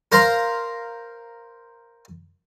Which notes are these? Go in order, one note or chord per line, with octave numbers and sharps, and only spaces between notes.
A#4 C5 F5 A#5 C6